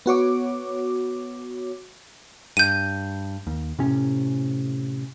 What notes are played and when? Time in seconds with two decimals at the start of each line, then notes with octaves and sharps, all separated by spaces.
0.06 B3 F#4 C#5 D6
2.57 G2 G6 D#7
3.47 D#2
3.79 A2 C3 C#4